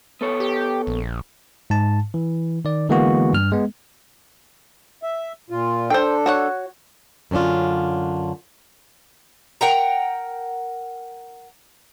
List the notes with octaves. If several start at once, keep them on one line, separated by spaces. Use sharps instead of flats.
B3 A4 C#5
G4
A#1
G#2 A5
E3
D#3 D5
D3 E3 G#3 A#3 B3 F#4
G2 F6
G#3 B3
E5
A#2 F4
D4 A4 C5 G5
F#4 C#5 F#5
F#2 D3 C#4 D4 F4
A#4 F#5 G5 A#5